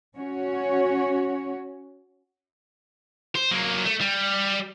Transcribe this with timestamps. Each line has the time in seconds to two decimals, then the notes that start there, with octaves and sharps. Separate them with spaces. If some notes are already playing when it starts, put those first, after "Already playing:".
0.16 C#4 F#4 C#5
3.35 C5
3.51 F#3 A#3
3.85 A3
4.01 G3